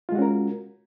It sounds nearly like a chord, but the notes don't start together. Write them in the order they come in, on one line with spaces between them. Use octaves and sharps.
F4 G#3 F#4 C#4 A#4